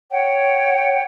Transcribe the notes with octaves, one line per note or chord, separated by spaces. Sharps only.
C#5 F#5 G5